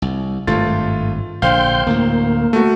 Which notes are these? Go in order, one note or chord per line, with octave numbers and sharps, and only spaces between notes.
C2
G#1 G2 A3 F4 A6
A#1 D3 C5 F5 G5 C6 G6
D2 A2 A#3
A3 F#4